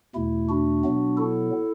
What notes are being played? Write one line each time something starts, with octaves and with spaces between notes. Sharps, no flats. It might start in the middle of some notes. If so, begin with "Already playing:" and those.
E2 B2 A3 E4
D4 F#4
B2 F#3 B3
E4 A4